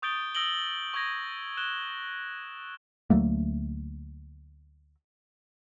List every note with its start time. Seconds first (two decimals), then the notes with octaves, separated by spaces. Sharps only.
0.02 C#6 D#6 G6 A6 D7 G7
0.35 D#6 E6 A#6 D7 F#7 G7
0.94 C#6 D#6 G#6 A#6
1.57 F#6 E7 G7
3.10 D2 F#3 A3 A#3